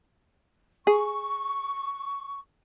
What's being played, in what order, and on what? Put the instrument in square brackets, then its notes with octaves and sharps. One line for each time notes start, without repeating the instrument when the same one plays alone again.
[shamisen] G#4 [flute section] C#6